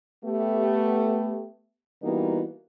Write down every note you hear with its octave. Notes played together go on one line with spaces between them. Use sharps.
A3 B3 G4
E3 G3 A#3 B3 D#4 F#4